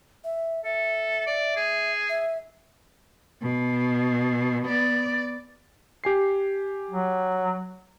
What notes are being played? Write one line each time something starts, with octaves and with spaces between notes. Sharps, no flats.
E5
A4 E5
D5
G#4
E5
B2
B3 D5
G4 G#5 C7
F#3